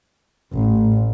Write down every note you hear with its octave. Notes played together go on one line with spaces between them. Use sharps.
A1